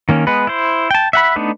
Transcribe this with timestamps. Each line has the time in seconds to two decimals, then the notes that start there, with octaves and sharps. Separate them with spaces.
0.09 D#3 A#3 C#4
0.27 G#3 B3 B4
0.47 E4 C5
0.91 G5 A5
1.13 E5 F#5 B5
1.36 A3 B3 D4 D#4 B4